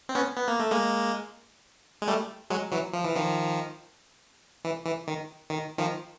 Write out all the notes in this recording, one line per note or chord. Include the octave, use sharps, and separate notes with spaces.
C4
B3 C#4
B3
A#3
A3
G#3 A#3
G#3
G3 A3
F#3 G#3
E3 F#3
F3
E3
D#3 F3
E3
E3
D#3
D#3
D#3 F3